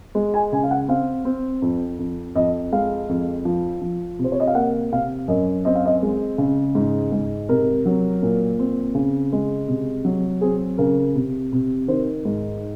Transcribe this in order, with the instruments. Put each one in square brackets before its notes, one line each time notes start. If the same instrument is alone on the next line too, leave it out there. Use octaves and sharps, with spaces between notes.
[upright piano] G#3
G#5
C#3 G#5
F5
F#5
C4 F5
C4
F2
F2
F2 D#5
G#3 F5
F2
F3
F3
C3
C5
C#5
D#5
F5
A#3 F#5
C3 F5
F#2 D#5
C4 D#5
F5
D#5
G#3
C#3
G#2
G#2
C3 A#4
F#3
A#2
C4
C#3
G#3
C3
F#3
C4 G#4
C#3 A#4
C3
C3
D#3 C5
G#2